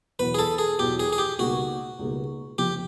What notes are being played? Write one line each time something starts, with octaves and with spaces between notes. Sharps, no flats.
E1 E2 B2 F#3 B3 B4
G#4
A4
G#4
E1 E2 B2 F#3 B3 G4
G#4
G#4
G4
C#2 B2 G3 A#3 D#4 F#4
C#2 B2 G3 A#3 D#4
F1 F2 C3 F3 G4